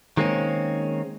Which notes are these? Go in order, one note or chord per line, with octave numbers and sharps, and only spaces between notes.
D#3 G#3 A#3 C4 C#4